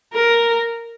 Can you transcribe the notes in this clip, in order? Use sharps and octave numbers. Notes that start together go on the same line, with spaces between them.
A#4